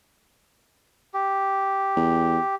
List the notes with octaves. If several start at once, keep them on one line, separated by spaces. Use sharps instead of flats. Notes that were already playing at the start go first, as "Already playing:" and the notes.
G4
E2